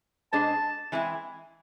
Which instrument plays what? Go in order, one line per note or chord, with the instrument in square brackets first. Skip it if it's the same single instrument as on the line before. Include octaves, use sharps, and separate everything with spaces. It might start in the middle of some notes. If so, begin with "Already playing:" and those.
[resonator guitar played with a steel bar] B2 G#3 D4 G#4 C5 [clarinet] A5
[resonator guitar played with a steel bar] E3 G#3 C4 E4